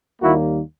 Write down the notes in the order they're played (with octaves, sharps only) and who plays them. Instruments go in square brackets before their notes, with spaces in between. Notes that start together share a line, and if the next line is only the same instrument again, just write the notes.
[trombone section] D#2 D#3 G3 A#3 E4 F#4